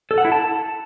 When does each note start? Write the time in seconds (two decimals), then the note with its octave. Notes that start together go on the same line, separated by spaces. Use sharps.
0.11 A4
0.18 F#5
0.25 E4
0.32 A5